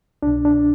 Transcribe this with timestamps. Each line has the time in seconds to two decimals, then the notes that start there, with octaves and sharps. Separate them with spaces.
0.23 C2 B2 D4
0.45 D4